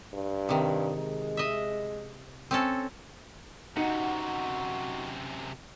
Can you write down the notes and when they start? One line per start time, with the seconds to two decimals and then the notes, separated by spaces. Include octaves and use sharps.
0.14 G2
0.49 C3 D#3
0.97 G#3
1.37 D#5 E5
2.51 C4 C#4 A4
3.77 F#2 C3 D#4 F#4 F#5